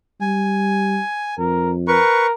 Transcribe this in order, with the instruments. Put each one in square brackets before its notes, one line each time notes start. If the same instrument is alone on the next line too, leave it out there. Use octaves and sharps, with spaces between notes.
[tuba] G3 [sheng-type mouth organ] G#5
[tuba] F2 [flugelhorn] A#4
[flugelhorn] A#4 [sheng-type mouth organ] B4 C#6